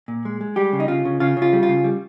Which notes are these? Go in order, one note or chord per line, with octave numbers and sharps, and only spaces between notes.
A#2
G#3
G#3
G3 G4
C#3
D#4
C#3 F4
C#3
C#3 F4
C#3
F4
G3
F4
C#3
G3